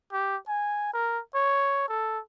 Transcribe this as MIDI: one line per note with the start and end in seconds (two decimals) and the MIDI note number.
0.13 0.36 67
0.48 0.90 80
0.93 1.19 70
1.35 1.84 73
1.88 2.19 69